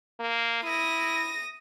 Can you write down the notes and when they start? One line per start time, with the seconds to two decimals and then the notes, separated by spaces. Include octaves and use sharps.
0.20 A#3
0.63 E4 D#6 A#6